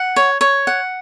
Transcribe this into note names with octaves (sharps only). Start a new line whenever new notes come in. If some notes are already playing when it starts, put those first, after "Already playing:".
Already playing: F#5
C#5
C#5
F#5